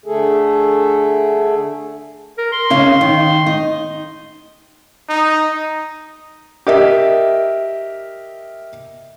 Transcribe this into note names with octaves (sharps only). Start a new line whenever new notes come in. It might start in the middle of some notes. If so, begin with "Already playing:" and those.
D3 A3 G#4 A4
A#4
C6
C#3 C#4 F5
D#3
D#4
D#4
G4 A#4 D#5 E5